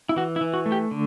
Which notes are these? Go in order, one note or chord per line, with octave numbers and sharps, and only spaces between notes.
E4
E3 F#4
E4
E3
F#4
A3
G4
D3